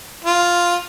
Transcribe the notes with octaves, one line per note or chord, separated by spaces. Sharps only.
F4